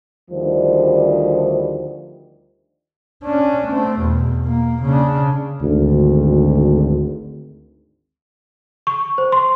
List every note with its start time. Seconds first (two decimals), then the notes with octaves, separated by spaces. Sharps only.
0.31 D2 D#3 F3 G3 C5
3.24 C#4 D4
3.68 A3 C4
4.00 E2 B2
4.45 A#3
4.83 C#3 D4
5.61 G#1 D2
8.87 C#6
9.18 C5
9.32 C6